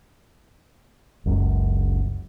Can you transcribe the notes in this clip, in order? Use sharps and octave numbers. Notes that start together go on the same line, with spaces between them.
F#1 C#2 F#2